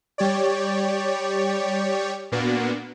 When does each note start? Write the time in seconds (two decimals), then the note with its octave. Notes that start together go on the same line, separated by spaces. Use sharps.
0.18 G3 G4 C#5 D5
2.32 A#2 A#3 B3 D4 F#4